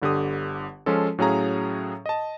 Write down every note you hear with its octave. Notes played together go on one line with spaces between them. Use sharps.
G1 D3 G4 D#6
F3 G#3 C#4 F4 A4
A2 F#3 C#4 G#4 F5 A#5
D#5 A5